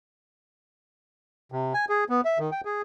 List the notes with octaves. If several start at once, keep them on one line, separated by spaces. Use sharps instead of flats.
C3
G#5
G#4
B3
E5
D#3
G5
G#4